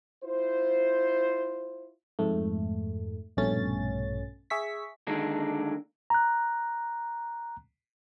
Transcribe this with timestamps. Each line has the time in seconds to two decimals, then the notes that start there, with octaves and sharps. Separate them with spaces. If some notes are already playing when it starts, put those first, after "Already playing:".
0.23 E4 F4 C5
2.19 F2 G#2 A3
3.37 A#1 G2 B2 A3 C#4 A6
4.50 G#4 E5 C#6 B6
5.07 D3 D#3 G#3 A#3 D4
6.10 A#5 F#6